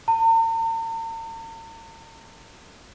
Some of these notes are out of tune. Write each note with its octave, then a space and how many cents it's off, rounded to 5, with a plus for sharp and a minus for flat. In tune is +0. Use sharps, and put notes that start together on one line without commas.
A#5 -45